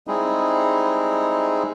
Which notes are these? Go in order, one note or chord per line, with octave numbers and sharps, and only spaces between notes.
G3 G#3 C4 D#4 E4 G#4